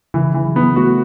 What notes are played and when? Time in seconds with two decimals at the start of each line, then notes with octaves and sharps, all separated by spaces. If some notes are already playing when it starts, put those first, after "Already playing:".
0.14 C#3 E3
0.34 E3
0.45 F#3
0.56 F#3 B3
0.76 A3 F#4